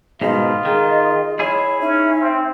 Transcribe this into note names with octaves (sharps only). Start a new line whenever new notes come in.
G#2 B2 D#3 F4 D#5
D#3 G#4
E4 G#4 C#5
C#4 D#4 E5
C4